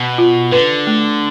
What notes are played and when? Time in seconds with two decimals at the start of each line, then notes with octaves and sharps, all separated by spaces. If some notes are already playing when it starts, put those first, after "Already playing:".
Already playing: B2
0.18 F4
0.52 D3 B4
0.87 A3